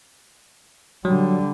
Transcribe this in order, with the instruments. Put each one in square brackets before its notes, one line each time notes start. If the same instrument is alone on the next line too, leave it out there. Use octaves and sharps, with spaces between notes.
[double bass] D3 G3 [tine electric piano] F#3